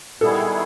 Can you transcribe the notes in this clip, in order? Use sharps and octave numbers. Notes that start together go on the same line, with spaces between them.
D#3 G3 B3 E4 G#4 A4